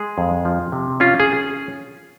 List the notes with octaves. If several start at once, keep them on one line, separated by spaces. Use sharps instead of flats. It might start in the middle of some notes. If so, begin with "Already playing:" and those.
Already playing: G#3 G#4
F2
F3
C3
C#4 F4
G#4